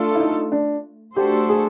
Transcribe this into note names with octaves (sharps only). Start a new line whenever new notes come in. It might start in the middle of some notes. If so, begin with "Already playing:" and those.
Already playing: A3 D4 F4 A4
E4
D#4
D4
A3 D4 F#4 G4 A4 C5
G#4